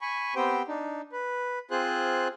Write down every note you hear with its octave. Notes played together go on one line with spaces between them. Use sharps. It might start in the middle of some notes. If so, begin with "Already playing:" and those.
G#5 B5 C#6
B3 C4 G4 C5 G5
D4 D#4
B4
C4 F4 G#4 C5 F#6